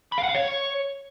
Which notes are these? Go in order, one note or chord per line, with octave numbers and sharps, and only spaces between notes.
B5
F5
F#5
F5
C#5